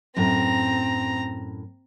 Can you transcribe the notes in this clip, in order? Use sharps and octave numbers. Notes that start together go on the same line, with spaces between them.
F#2 A2 C4 A#5